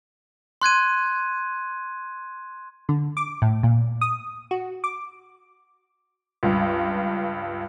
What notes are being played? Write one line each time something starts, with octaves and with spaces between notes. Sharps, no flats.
C6 F#6 G#6 D#7
D3
D6
A2
A#2
D#6
F#4
D6
C#2 G2